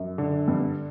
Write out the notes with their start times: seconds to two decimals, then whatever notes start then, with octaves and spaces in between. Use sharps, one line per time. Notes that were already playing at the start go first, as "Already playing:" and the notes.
Already playing: F#2
0.18 D3
0.48 G2